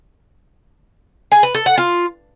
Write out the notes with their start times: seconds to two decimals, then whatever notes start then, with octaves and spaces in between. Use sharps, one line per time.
1.32 G#4
1.43 B4
1.55 A4
1.66 F#5
1.78 F4